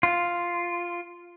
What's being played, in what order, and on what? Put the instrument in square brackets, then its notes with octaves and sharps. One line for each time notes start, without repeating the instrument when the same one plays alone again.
[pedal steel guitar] F4